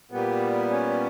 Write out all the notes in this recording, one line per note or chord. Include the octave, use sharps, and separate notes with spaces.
A#2 G3 B3
C#4